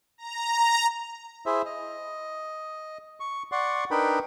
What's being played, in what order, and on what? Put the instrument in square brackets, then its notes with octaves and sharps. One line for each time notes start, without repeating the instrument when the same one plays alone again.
[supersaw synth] A#5
[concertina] E4 G#4 C5 E5
D#5
C#6
D5 F#5 C6 C#6
D4 D#4 A#4 B4 G5 B5